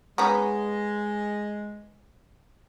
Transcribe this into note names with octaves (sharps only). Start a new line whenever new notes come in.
G#3 B3 C#4 D#4